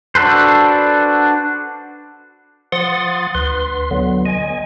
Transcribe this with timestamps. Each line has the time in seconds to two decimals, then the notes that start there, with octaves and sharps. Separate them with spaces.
0.15 D4 F#4 A4 B4 C5
2.72 F3 F#5 C6 D#6 A6
3.35 D2 B4 C6
3.91 D3 F#3 B3
4.26 D#5 G#5